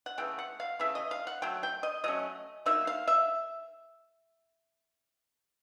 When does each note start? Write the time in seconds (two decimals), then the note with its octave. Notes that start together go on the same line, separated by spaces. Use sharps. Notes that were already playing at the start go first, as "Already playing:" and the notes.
0.06 F#5
0.18 C#3 E3 A3 G5
0.39 F#5
0.60 F5
0.79 C#3 E3 A3 E5
0.95 D#5
1.11 F5
1.27 F#5
1.42 F#3 A3 G5
1.63 G5
1.83 D#5
2.04 F#3 A3 C#4 D#5
2.66 F#3 A#3 D#4 E5
2.87 F5
3.07 E5